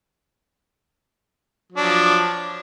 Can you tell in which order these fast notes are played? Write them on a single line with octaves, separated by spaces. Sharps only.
F#3 D4 F3